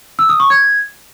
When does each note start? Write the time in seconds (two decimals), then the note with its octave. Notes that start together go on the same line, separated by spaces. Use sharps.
0.19 E6
0.29 D#6
0.40 C#6
0.50 G#6